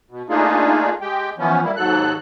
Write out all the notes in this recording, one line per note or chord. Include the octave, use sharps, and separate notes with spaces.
B2
A3 A#3 D4 D#4 F4 G#4
G#3 G4 G5
E3 F3 B3 C#4
G3 A#3 E4
D#2 G#2 F#3 A4 F#6